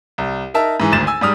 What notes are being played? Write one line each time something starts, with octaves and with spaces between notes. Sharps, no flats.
C2
D#4 A#4 E5 A5
G#2 E3
G#1 D2 A6 E7
G#5 E6
G#2 G3 D#6 F6